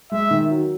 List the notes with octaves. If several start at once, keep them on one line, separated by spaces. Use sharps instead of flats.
G#3 E5
D#3
F#3